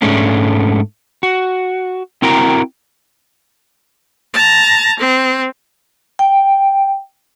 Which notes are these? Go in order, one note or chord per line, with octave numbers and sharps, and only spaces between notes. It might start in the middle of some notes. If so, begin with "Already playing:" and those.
G#2 G#3 A3 C#4 D4
F#4
C4 E4 F#4 A#4 G5 A#5
A5 A#5
C4
G5